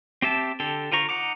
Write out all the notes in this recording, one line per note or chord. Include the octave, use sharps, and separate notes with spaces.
C4 G4 E5 A5
D3 G4 A4
D3 F4 C5 A#5 C#6
D#4 F#5 A#5 D6